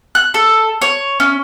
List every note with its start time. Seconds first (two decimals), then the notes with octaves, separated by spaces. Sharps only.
0.15 F#6
0.34 A4
0.82 C#5
1.20 C#4